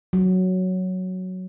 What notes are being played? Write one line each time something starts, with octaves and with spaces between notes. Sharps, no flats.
F#3